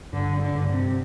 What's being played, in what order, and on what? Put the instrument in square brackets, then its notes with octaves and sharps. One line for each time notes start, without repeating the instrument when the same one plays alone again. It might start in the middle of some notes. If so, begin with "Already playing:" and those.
[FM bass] G2 [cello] D3
[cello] D3
[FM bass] G2
[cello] C3